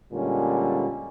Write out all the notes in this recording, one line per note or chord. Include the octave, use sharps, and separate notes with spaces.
A#2 D3 G3 G#3 C#4